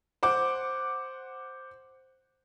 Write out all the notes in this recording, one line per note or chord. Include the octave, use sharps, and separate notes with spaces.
C5 F#5 D6